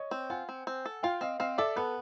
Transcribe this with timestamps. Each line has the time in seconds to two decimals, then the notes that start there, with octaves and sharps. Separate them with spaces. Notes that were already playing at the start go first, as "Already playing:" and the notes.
Already playing: C#5 D#5
0.11 C4
0.30 F4 F#5 G#5
0.49 C4
0.67 C4
0.85 A4
1.03 F4 F5 G5
1.21 C4 D#5 F5
1.40 C4 D#5 F5
1.58 A4 D5 E5
1.76 B3 A4 B4